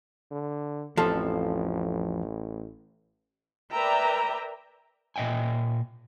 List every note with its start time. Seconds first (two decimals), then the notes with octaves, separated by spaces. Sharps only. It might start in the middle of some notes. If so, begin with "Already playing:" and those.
0.32 D3
0.97 A1 F2 F3 A4
3.73 A#4 B4 D5 E5 G5 A#5
5.16 A#2 D#5 E5 G5 G#5